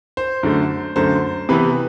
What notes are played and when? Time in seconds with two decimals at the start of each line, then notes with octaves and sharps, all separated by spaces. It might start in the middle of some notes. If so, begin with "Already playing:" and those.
0.17 C5
0.43 F#2 D3 A3
0.96 F#2 D3 A3 C5
1.49 C3 E3 B3 B4